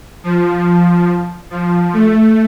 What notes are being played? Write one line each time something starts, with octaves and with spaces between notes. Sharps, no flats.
F3
F3
A3